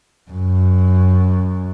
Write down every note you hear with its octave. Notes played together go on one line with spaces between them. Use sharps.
F#2